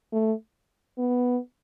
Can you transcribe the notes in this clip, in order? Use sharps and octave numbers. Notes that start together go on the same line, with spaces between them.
A3
B3